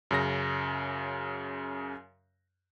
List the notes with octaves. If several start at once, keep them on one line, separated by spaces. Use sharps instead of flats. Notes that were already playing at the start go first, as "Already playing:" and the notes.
F#2 C#3 A#6